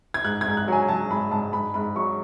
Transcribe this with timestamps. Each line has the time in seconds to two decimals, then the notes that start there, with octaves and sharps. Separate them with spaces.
0.14 G#6
0.24 G#2 F#6
0.41 G#6
0.46 G#2
0.57 F#6
0.68 F#3 G#5
0.88 F#3 A5
1.10 G#2 B5
1.31 G#2 A5
1.53 G#2 B5
1.74 G#2 B5
1.96 F#3 C#6